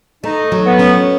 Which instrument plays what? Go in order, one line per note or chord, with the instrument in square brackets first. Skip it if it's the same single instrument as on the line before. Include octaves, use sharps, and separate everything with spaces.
[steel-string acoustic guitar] A3 [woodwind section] D#4
[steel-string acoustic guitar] F#3
[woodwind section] B3
[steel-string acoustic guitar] C#4